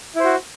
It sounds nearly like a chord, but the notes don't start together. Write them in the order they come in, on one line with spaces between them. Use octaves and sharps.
E4 C5 F#4